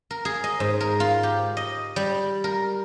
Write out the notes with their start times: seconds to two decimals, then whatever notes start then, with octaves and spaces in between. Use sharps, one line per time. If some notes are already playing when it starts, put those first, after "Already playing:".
0.11 A#4
0.25 G#4
0.44 D#5
0.60 G#2
0.80 A#4
1.00 F4
1.23 G4
1.57 D#5
1.96 G3
2.44 A#4